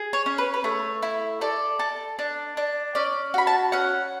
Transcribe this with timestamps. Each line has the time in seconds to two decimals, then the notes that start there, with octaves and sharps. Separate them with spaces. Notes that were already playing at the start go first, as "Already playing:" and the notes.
Already playing: G#4
0.13 C#5
0.26 C#4
0.38 B4
0.54 B4
0.64 A3 C#5
1.03 E4
1.41 A4 D5
1.79 A4
2.19 D4
2.57 D4
2.95 C#4 D5
3.34 F#4 B5
3.47 A5
3.72 C#4 F#5